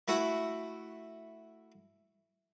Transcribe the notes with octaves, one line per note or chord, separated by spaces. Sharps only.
A3 E4 F#4